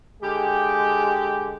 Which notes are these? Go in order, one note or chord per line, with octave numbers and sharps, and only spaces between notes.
D3 G#3 G4